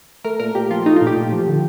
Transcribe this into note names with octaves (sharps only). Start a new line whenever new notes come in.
A3 A#4
A#2 A#4
A#2 G4
F3 F4
A3 D#4
F4
A#2
G4
A#2
F3
D3